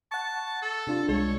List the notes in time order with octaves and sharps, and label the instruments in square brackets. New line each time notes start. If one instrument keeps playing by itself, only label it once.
[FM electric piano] F#5 C#6 [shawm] A5
[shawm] A4
[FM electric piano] C3 D4 F4
[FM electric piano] C2 G#3 [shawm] C#5